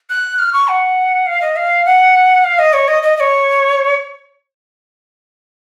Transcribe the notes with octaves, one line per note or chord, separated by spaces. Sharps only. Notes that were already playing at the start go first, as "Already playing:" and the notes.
F#6
F6
C#6
F#5
F5
D#5
F5
F#5
F5
D#5
C#5
D#5
D#5
D#5
C#5